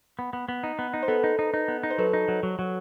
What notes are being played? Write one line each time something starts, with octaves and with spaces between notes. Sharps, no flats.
B3
B3
B3
D#4
B3
D#4
C5
B3 A4 B4
D#4
D#4
D#4
B3
D#4
C5
F#3 A4 B4
D#4
F#3
F#3
F#3